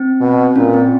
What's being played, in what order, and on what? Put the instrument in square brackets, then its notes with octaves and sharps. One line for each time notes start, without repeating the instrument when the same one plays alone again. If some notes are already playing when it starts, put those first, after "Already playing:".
Already playing: [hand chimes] C4
[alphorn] B2
[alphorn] A#2 [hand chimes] C#4
[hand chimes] C4